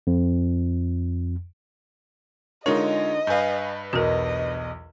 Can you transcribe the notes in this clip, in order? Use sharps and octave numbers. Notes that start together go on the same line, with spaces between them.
F2
D3 G#3 D#4 F4 A#4 C#5 D#5
G2 B4 F5 G#5 G6
B1 E2 F#4 A#4 D#5